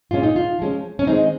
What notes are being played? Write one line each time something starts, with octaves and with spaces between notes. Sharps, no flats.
A#2 G#3 C#4 F4
D#4
F4
F3 G#3 C#4
C#4
D#3 G#3 C4 D#4